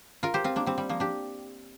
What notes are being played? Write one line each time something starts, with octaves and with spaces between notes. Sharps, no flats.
F4 A#4
G4 C5
C4 F4
A#3 D4
G3 C4
G3
F3 A#3
D4 G4